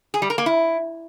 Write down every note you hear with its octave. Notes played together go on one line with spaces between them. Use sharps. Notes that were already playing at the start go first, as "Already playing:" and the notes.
G#4
G3
A#4
A#3
E4